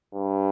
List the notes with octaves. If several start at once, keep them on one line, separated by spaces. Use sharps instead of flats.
G2